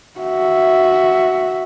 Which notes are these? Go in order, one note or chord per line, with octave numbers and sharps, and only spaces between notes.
F#4 E5